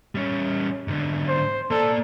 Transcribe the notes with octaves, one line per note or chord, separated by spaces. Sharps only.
G3 C#4
G#2 D3
C5
A#3 A4 D5